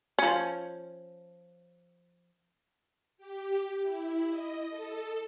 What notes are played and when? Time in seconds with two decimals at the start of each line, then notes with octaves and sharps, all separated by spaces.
0.19 F3 C#4
3.18 G4
3.83 E4
4.29 D#5
4.70 A4